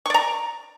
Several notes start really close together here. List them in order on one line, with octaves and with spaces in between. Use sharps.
C#6 D5 A#5